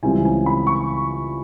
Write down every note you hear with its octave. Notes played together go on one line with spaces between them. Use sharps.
C#2 C#3 E3 G3 C4 G#5
G#5
B5
C#6